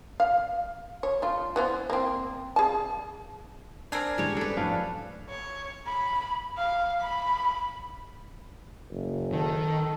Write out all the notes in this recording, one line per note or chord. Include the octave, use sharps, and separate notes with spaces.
F5
C#5
A3 F4
E3 B3 C5
A#3 C4
G#4 A5
C4 D4 A#4 G#5
G#1 F#2 D3 G3 G#3 C#5
F#2 D4 A4 B4
F2 A2 F#3 D4 F5
C#5
B5
F5
B5
F#1
D#3 A4